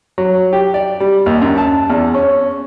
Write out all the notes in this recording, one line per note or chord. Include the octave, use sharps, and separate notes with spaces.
F#3
G4
D5
G3
D#2
F#2
A5
E2
C#4